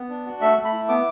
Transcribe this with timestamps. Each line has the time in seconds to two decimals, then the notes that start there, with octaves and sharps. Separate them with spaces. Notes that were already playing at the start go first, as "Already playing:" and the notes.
Already playing: B3
0.09 D4
0.26 F#4
0.41 A3 E5
0.57 A3
0.65 B5
0.73 E4
0.88 B3 D6